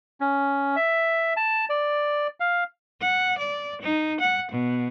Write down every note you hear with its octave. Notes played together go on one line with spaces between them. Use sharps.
C#4
E5
A5
D5
F5
F#5
D5
D#4
F#5
B2